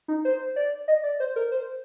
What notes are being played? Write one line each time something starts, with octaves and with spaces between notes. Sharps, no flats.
D#4
C5
D5
D#5
D5
C5
A#4
C5